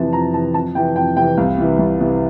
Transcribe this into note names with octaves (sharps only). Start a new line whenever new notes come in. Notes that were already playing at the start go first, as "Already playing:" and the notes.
Already playing: F2 C3 E3 A5
F2 A#5
C3 E3 A5
F2 A5
C3 E3 G5
F2 G5
C3 G5
E3
C2 F5
C3 E3
C2
C3 E3